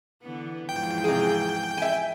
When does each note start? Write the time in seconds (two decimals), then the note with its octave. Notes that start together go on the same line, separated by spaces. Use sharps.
0.23 D3 E3 B3
0.69 E2 G#2 F3 G5
1.04 C3 G#4
1.77 E5 G#5